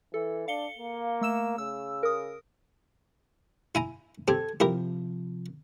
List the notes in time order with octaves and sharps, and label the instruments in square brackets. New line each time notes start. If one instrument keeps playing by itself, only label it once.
[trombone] E3 [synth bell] A4
[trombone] D4 [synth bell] F5 C#7 G7
[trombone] A#3
[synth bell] A3 E6 E7
[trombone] C#3 [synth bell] E6
[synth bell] A#4 D#6
[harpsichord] E4 G#5 A#5
[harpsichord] C4 G4 [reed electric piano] A4 G#6
[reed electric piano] C3 F3 [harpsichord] E4 G4 A#4